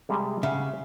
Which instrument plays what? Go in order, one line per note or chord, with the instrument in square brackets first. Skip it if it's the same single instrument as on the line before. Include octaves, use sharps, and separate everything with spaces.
[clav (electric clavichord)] C3 G3 G#3
[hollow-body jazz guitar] C#3 [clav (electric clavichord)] E5 F#5